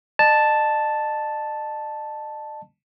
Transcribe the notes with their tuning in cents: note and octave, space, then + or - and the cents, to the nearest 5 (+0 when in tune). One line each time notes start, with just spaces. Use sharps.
D#5 -40 A5 +0